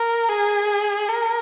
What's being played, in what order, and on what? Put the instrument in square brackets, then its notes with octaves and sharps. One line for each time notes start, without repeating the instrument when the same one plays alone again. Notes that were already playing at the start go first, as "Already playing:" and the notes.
Already playing: [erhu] A#4
G#4
A#4